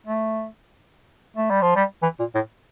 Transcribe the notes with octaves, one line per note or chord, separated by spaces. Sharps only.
A3
A3
G3
F3
G3
E3
A#2
A2